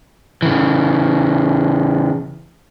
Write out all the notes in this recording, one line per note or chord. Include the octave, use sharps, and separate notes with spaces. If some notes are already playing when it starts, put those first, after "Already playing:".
C#3 E3